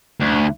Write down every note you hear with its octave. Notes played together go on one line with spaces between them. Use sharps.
D2